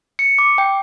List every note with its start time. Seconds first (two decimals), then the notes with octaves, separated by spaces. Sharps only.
0.19 C#7
0.39 D6
0.58 G5